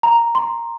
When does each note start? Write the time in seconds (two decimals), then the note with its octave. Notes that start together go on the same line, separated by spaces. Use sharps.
0.03 A#5
0.35 C6